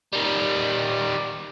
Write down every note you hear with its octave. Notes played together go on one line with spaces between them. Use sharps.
D#3 G3